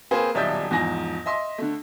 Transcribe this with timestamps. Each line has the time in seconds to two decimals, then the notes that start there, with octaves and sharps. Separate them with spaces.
0.11 A#3 C4 G#4 B4 C5
0.34 D#1 B1 D5 E5 D#6 G6
0.71 E2 G#2 F3 G#5 A#6
1.26 D#5 E5 C6
1.58 D3 A3